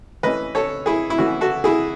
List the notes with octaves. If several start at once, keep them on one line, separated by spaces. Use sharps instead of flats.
E3 A3 C#4 B4 D#5
A4 C#5
E4 G#4
E4
E3 A3 C#4 F#4
F#4 A4
E4 G#4